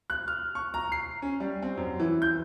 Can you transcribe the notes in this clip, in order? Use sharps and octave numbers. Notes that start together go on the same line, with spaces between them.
F#6
F6
C#6
A#5
C7
C#4
G3
C4
F#2
E3
G6